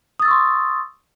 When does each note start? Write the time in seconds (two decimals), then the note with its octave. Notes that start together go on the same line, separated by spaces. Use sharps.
0.19 D#6
0.22 A6
0.25 E6
0.28 C#6
0.31 C6